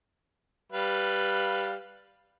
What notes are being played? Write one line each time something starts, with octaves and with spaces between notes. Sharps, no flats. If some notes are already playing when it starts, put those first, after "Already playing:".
G3 B4 F5